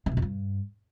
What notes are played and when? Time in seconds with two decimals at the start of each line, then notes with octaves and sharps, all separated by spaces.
0.06 E3
0.12 B2
0.17 F2
0.22 G2